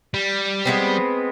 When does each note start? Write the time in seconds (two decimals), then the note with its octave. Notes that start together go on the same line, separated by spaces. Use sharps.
0.14 G3
0.65 G#3 B3 C4